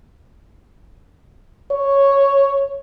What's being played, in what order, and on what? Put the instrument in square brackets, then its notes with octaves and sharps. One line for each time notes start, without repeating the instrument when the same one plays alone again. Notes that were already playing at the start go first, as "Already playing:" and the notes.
[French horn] C#5